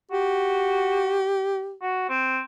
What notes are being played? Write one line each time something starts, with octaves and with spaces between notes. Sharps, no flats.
F#4 G4
F#4
C4